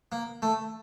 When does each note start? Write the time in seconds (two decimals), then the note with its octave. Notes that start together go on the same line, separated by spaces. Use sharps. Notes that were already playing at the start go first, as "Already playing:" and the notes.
0.12 A#3
0.42 A3